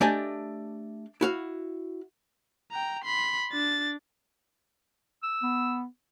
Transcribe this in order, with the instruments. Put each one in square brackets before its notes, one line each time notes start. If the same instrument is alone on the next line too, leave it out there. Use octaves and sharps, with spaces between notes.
[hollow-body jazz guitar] A3 D4 G4 D5 D#5 G#5
E4 F#4 F5
[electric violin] G5 A#5
B5 C6
D4 A6
[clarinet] E6
[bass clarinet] B3